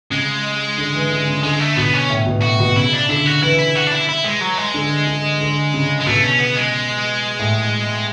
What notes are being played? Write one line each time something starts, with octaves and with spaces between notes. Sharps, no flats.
C#3 G#3
D3
E3
D3
C#3
D3 G#3
A3
B2 B3
C#4
A2
B2
A2 F#4
B2
C#3 E4
D4
D3 E4
F#4
E3 E4
E4
F#4
D4
E4
E4
G#3
F#3
G#3
D3
D3
D3
C#3
G#3
B2 A3
C#4
B3
G#3
A2